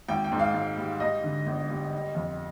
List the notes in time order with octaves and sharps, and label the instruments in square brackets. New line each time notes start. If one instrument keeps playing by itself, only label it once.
[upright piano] G#1 G5
G5
G#2
F5
G#1
G3
G3 D#5
D3
G1
G3
G3
F2